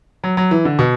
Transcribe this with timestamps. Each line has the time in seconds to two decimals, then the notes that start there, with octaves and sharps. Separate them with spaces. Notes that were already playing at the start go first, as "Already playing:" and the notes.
0.24 F#3
0.37 F#3
0.51 E3
0.65 D3
0.79 B2